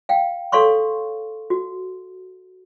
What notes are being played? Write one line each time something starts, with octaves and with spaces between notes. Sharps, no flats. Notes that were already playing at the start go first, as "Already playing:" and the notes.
F5 G5
A4 C#5 F5 C6 C#6
F#4